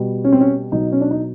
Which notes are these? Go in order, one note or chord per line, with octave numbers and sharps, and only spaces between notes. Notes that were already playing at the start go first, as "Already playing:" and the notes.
Already playing: B2 G3
C#4
C4
C#4
B2 F#3 D#4
C#4
D4
D#4